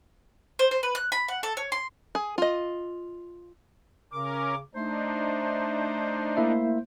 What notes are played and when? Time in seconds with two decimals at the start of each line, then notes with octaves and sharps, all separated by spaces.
0.59 C5
0.71 C5
0.83 B4
0.95 F#6
1.12 B5
1.28 F#5
1.43 A4
1.57 C#5
1.72 C6
2.15 G#4
2.38 F4 D#5
4.13 C#3 C#4 A#4 D6
4.75 A3 D4 D#4 C5
6.37 A#3 E4 E5